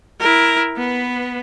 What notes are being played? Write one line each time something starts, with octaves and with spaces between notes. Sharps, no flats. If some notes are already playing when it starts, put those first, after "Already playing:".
E4 A#4
B3 B4